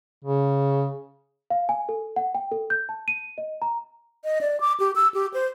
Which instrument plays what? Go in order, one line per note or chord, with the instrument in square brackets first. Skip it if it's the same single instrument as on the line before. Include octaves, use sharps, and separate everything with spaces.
[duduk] C#3
[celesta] F5
G#5
A4
F#5
G5
A4
G6
A5
D#7
D#5
A#5
[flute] D#5
D5
D6
G4
E6
G4
C5